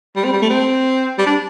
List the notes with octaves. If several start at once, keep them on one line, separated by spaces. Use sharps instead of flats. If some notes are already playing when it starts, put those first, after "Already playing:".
G3
C4
G3
A3
C4
G3
D4